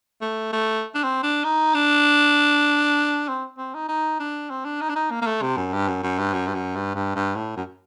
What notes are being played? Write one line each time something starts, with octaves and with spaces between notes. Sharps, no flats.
A3
A3
D4
C4
D4
D#4
D4
C4
C4
D#4
D#4
D4
C4
D4
D#4
D4
D#4
A#3
A#3
A3
C3
F#2
G2
F#2
F#2
G2
F#2
G2
F#2
G2
G2
G2
A2
F#2